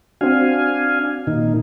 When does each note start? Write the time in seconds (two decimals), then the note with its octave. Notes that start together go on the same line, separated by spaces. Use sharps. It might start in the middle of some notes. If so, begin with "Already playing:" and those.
0.21 C4 D4 F#4 F5 G#5
1.27 A#2 D#3 D#4